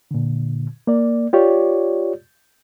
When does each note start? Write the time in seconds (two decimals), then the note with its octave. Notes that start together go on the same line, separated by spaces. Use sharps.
0.11 A#2 D3
0.87 A#3 D5
1.33 F4 G4 C#5 D5